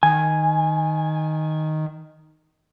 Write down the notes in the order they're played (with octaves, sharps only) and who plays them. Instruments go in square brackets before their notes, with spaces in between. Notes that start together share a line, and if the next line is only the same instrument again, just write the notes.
[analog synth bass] D#3 [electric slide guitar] G#5